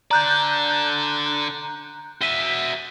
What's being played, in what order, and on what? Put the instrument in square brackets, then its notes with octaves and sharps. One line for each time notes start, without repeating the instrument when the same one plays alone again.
[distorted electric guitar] D3 D5 [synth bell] A#5 F#6 G6
[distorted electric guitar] F#4 E5 [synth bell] B6 D#7 G7